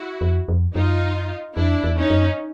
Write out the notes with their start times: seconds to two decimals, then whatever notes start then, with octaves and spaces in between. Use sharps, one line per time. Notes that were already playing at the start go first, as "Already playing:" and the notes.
Already playing: E4 F#4
0.21 F2
0.48 F2
0.75 F#2 D#4 F4
1.56 F2 D4 E4
1.84 E2
1.97 C#4 D#4
2.10 F#2